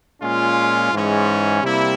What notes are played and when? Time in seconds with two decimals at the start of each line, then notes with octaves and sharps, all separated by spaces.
0.21 A#2 G#3 C#4 F4
0.92 G#2 E3 G#3 C#4
1.63 C3 G3 A#3 E4